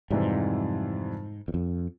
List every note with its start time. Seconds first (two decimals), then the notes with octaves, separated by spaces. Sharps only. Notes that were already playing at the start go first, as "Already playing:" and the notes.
0.11 F2 G#2 C3 E3 G3
1.48 E2
1.54 F2